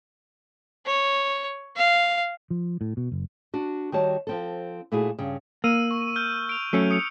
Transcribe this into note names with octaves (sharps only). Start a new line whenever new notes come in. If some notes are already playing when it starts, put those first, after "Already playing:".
C#5
F5
F3
A2
B2
F#1
D4 F#4
D#3 G3 F#4 C#5 A5
F3 C4 A4
A#2 A3 E4 F#4 G#4
G2 C#3
A#3 E6 D#7
C#6
F6 G6
D7 F7
F#3 A3 C#4
D#6 C#7